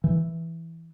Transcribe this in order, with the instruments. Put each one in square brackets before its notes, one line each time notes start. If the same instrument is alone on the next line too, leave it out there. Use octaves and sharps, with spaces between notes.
[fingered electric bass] E3